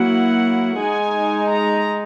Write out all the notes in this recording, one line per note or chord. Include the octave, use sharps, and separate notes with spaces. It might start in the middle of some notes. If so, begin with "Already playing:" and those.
Already playing: F#3 A#3 E4 F#5
G#3 D#4 G#5
A#5